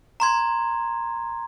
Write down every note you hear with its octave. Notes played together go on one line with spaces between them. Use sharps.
A#5 C6 G#6